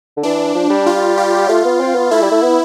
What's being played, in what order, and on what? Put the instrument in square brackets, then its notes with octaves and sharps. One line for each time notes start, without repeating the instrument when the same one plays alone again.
[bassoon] D3
[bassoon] E3 [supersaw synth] D4
[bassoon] F3
G3
[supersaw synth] F4
G4
[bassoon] A3 [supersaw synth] F4
[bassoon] B3
C4
B3
[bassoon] A3 [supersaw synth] E4
[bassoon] G3
A3
B3